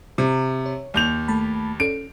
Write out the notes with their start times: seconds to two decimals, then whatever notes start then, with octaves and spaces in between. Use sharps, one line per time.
0.18 C3
0.66 C#5
0.94 D#2 G6 F7
1.28 A3 A5 B5
1.80 C#4 A4 D7